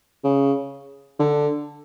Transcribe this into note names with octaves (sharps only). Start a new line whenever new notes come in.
C#3
D3